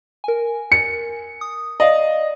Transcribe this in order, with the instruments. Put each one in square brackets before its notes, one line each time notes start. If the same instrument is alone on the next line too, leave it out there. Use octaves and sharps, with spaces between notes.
[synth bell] A#4 G#5
[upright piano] C#7
[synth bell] D#6
[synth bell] D5 F5 [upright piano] D#5